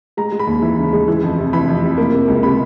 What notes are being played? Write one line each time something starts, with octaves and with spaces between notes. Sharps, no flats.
G#3 A#5
G#3
B5
D#2
E3
C#3
G#3
E3
F2
C3
E3 B5
F2
C3
A#3
C3
C#2
C3 B5